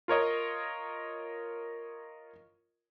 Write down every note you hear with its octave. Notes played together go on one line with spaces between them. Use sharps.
F4 A#4 C#5 D#5